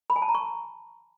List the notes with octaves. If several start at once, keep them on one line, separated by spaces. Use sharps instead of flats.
B5
G#5
A5
A#5
C#6